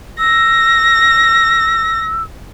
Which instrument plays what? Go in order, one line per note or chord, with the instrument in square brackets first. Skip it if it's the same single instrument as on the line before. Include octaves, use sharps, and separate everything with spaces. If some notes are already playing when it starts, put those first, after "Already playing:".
[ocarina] E6 [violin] A#6